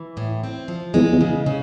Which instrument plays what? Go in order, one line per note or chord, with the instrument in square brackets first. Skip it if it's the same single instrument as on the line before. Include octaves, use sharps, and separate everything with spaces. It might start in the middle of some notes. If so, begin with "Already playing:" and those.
Already playing: [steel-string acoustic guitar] E3
A2
C4
F3
[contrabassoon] E2 [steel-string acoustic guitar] G#3
[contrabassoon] E2
[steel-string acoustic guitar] C#3
C#3